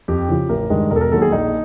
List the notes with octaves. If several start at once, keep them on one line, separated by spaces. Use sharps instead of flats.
F2 G4
C#3 F3
A1 A#4
G2 D#3 G#3
E1 A#4
A4
A#4
D#2 D#3 F#3 A4
G#4
A#1 D#4